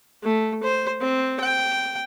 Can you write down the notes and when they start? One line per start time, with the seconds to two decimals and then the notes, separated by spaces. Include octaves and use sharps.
0.23 A3
0.64 C5
1.01 C4
1.40 G5